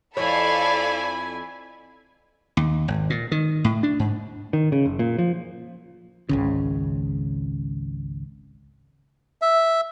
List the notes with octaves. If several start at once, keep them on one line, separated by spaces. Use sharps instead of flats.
F2 E4 A4 C#5 D5 F5 G#5 B5
D#2
G#1
A#2
D#3
A2
D4
G#2
D#3
C#3
F#1
A#2
F3
G#1 C#2 C#3
E5